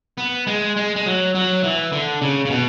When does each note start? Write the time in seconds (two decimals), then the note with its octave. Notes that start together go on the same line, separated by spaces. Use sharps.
0.18 B3
0.47 G#3
0.76 G#3
0.96 G#3
1.06 F#3
1.35 F#3
1.64 E3
1.92 D3
2.22 C#3
2.45 C#3
2.50 B2